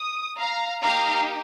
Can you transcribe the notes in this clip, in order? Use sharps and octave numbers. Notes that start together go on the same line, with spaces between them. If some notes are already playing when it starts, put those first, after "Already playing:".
Already playing: D#6
F5 A#5
A#3 D#4 G4 F5 A#5